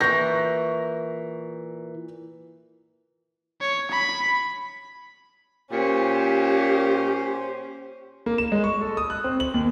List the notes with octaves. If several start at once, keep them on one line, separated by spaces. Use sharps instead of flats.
A#2 E3 C#6 G6 A#6
C#5
B5
A#2 C#4 G4 C5
A#3
E7
G#3
C#6
A4
D#6
F#6
C4
F#7
D#2